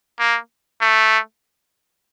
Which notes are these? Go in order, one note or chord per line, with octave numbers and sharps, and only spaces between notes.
A#3
A3